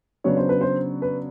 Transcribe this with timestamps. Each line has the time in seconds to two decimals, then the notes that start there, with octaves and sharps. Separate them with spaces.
0.24 C#3 F#3 B3 D4 C#5
0.37 C5
0.49 B4
0.61 C5
1.02 B4